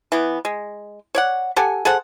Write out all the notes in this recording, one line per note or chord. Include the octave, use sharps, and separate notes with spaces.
E3 B3
G#3
C#5 D5 F#5
G4 A4 F#5 G#5
G#4 A4 C5 F#5